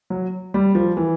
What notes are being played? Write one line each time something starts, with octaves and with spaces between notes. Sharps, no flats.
F#3
G3
F3
E3